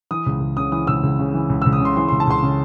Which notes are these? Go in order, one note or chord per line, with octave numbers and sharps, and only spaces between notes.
E3 D#6
C#2
C#2
C#3 D#6
E3 D#6
C#2 E6
C#2
C#3
E3
C#2
C#2 E6
D#6
C#3 C6
E3 C6
C#2 C6
A5
C#2 C6
C#3